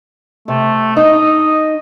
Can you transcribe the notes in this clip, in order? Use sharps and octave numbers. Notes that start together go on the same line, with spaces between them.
C3 A3
D#4 D#5